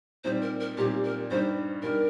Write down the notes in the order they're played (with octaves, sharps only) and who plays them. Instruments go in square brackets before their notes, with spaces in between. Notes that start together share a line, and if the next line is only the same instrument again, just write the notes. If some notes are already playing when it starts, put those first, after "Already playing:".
[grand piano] A#2 G3 C4 D#4 [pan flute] C5
[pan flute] A#4
A#4
[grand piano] A#2 G3 C4 D#4 [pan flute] G4
[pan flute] A#4
[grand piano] G2 G3 D#4 [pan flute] C5
[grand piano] G2 G3 D#4 [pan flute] A#4